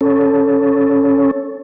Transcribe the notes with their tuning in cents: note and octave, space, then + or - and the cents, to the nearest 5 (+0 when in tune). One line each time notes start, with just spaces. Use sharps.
C#4 +0 A4 +0